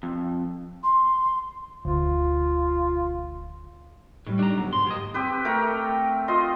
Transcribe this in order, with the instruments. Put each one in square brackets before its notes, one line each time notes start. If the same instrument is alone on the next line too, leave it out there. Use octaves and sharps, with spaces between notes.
[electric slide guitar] F2
[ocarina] C6
[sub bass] E1 [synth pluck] D2 [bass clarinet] F4
[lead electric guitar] A2 [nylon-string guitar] G3 A3 D#4
[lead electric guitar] D4 A#5
[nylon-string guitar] D2 B2 [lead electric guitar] F#3
[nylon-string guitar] D2 G#2 [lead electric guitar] C6
[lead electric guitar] D#2 D#5 [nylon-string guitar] G4
[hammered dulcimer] C4 G4 B4
A3 A#4 G5
F4 D#5 C6